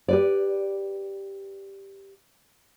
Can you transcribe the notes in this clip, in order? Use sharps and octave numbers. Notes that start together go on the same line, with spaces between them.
G4 B4 D5